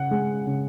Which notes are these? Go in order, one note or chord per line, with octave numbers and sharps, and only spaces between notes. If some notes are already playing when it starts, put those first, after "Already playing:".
Already playing: C#3 F#5
G#3
C#3